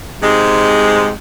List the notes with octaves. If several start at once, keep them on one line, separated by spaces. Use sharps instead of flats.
G#2 C3 G#3